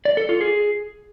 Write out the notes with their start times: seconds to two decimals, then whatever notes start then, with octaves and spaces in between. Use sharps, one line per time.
0.05 D5
0.17 A4
0.29 F4
0.41 G#4